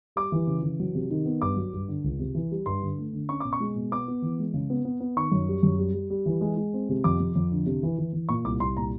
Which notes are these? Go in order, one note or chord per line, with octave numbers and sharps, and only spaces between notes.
G3 D6
E3
C#3
E3
F#3
C3
D#3
B3
G2 D6
F#3
G2
D3
C#2
C3
E3
G3
G2 C6
D3
A3
D3
C#4 C#6
B2 D6
C#6
G#3
B2
B3 D6
B3
E3
G#3
C#3
B3
B3
B3
D#3 C#6
F#2
G3
F#2
G3
G3
G3
E3
G#3
G#3
C4
C3
F2 D6
F2
F2
D3
C3
E3
E3
E3
A#2 C#6
C2 D6
C2 C6
A#2 A#5